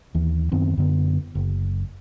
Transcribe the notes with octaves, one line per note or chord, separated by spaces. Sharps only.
D#2 E3
F#2 D#3 B3 C4
F#2 D3 B3
F#1